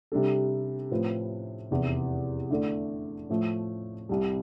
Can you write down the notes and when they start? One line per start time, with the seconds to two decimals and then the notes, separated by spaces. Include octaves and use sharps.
0.12 C3 G3 D4 A4
0.91 A2 F3 C4 F4 B4
1.71 F1 E2 C3 E3
2.51 D3 A3 E4 A4 D5
3.30 A2 F3 A3
4.09 C2 C3 G3